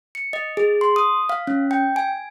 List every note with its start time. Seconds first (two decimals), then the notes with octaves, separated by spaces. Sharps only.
0.15 C#7
0.33 D#5
0.57 G#4
0.81 C6
0.96 D#6
1.29 F5
1.47 C#4
1.71 G5
1.96 G#5